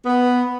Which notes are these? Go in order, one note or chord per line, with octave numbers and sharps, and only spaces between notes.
B3